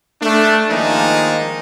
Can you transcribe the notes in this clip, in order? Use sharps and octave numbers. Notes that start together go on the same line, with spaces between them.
A3 D4
D#3 F3 G#3 A#3 D4 D#4